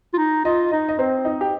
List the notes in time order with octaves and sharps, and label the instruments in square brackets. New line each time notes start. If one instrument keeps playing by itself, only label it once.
[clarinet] F4
D#4
[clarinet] F4 [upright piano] D#5
[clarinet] D#4 [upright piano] D#5
[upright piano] D#5
[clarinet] C4 [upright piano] C5
[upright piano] D#4
G4